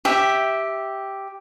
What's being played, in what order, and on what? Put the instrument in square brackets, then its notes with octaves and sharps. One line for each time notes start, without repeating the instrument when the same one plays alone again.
[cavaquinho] G4 E5